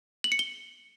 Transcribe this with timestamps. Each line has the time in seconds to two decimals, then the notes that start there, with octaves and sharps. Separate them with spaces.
0.24 F#7
0.32 C#7
0.39 G7